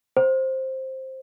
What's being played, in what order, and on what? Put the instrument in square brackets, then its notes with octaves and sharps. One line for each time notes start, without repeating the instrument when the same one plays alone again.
[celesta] C5